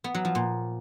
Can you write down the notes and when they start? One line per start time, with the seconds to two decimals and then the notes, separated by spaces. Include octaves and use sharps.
0.04 B3
0.15 F#3
0.25 F3
0.35 A#2